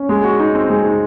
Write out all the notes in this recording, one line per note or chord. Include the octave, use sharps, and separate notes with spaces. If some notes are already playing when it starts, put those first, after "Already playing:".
Already playing: C#4
G#3
F#4
D#4
C4
G#3
D#4